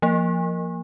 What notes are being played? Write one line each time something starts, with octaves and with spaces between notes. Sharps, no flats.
F3 A#3